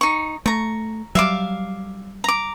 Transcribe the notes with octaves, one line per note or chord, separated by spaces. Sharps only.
D#4 C#6
A3 A#5 C#6
F#3 G3 E5 F5 D6
A#5 D6